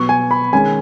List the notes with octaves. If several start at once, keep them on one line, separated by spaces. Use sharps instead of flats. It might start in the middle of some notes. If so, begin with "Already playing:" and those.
Already playing: B2 F#3 B3 C#6
G#5
B5
D#3 G#3 C#4 G#5